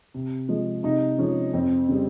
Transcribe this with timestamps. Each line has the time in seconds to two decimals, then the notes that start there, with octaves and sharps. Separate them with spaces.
0.14 C3
0.49 F3 G#3
0.83 C3 D#4
1.19 F3 G#3 C#4
1.54 F2 C4
1.88 C#3 G3